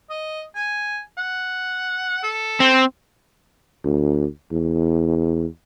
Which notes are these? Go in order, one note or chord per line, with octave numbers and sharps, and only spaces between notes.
D#5
G#5
F#5
A4
C4
D2
E2